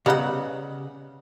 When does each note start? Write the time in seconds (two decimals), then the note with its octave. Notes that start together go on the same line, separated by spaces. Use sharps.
0.06 C#3 G3 B3 D#4 F#5